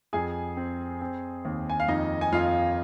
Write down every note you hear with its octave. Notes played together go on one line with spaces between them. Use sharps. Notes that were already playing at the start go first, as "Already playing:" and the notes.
F2 G#4 G#5
C4
C4
D#2
G#5
F5
F2 D#4 D#5
G#5
F2 F4 F5